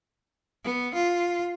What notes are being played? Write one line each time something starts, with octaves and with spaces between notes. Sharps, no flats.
B3
F4